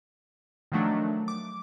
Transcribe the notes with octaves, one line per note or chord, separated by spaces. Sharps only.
D#3 F3 F#3 A3 D4
D6